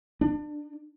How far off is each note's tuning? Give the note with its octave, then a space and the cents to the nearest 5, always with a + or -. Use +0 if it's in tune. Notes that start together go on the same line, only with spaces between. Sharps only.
D4 +25